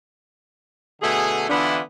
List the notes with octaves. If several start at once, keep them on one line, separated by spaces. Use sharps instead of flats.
B2 D3 A3 G#4
D3 E3 B3 D4 E4 F4